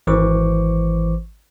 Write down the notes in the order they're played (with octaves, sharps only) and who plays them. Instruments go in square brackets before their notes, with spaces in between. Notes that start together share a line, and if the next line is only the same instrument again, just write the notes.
[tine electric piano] G#1 E3 C5 C#6 D6